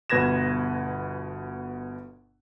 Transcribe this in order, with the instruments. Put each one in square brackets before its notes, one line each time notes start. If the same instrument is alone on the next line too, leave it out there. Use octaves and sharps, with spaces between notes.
[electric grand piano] G1 B2 B4 G#6 A#6 E7